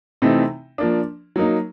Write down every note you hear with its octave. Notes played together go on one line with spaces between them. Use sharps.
C3 E3 A3 C4 D#4
F3 A#3 D4
F#3 A#3 D#4